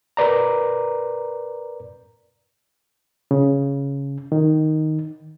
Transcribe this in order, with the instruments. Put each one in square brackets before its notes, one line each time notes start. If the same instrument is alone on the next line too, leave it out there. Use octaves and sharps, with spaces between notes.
[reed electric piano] A#4 B4 D5 A#5
C#3
D#3